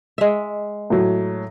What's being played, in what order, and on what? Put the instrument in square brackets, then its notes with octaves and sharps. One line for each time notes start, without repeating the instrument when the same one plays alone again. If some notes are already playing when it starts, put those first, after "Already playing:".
[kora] G#3 E5
[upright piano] A2 F#3